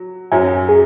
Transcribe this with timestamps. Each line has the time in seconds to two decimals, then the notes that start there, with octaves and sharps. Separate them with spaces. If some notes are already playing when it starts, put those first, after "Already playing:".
Already playing: F#3
0.32 F#2 F#3 C#4 G#5
0.69 G#4